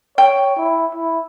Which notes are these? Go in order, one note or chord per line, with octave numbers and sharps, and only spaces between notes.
C#5 G5
E4
E4